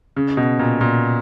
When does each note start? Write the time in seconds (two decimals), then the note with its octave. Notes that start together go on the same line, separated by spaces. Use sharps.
0.16 C#3
0.37 B2
0.59 A#2
0.81 A#2